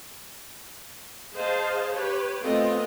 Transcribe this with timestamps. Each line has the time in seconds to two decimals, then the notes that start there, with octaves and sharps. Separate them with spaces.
1.34 G#4 C5 D#5 F5 A5
1.94 G4 B4 C#5
2.42 A3 B3 C4 F4 A4 D#5